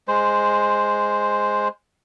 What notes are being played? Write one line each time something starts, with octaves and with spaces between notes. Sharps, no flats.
G#3 C5